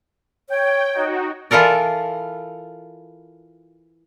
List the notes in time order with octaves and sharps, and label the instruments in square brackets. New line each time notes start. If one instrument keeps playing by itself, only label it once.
[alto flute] C#5 [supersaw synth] G5
[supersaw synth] D#4 F#4
[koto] E3 F4 A4 A#4 D5